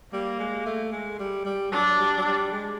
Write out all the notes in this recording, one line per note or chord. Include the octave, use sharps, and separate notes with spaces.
G3 A#3
G#3
A3
G#3
G3
G3
F#3 D4
G3
F#3
G3
G#3